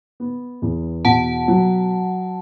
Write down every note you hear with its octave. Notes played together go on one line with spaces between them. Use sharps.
B3
E2
B2 F#5 A5
F#3